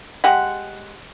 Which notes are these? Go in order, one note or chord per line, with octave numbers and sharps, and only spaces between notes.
G#3 G4 F#5